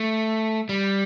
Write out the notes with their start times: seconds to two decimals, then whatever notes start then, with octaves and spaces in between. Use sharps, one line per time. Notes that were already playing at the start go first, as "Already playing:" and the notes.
Already playing: A3
0.69 G3